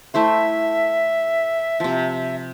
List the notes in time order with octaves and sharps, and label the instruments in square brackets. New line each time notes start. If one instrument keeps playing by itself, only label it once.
[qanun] A3 E4 C5 [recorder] E5
[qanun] C3 F3